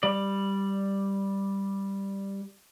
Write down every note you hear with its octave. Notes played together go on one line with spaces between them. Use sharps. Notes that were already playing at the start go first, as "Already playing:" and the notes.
G3 D5